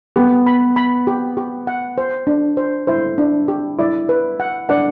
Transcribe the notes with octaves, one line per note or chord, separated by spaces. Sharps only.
B3 G4
B5
B5
G4
G4
F#5
C5
D4
C5
E4 C5
D4
G4
E4 D5
B4
F#5
D4 F#5